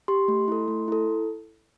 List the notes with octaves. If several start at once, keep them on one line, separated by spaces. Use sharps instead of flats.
G4 C6
A3
E4 A4
A3
E4 A4